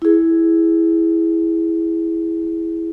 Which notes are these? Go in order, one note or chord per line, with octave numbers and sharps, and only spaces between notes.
E4 G#4